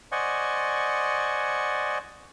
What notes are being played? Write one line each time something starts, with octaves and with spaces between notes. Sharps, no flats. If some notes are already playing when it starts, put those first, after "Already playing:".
C5 D5 D#5 F#5 G#5 C#6